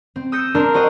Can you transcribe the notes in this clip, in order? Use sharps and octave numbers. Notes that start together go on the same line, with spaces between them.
C4
D#6 E6 G6 A#6 C#7
D4 A#4 C6
F#4 G4 C5 D#5